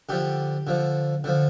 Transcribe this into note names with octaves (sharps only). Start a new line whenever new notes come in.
D3 F3 G4
D3 F3
D3 F3